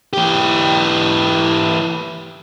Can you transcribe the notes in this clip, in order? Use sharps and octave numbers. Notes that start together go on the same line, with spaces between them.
E3 G4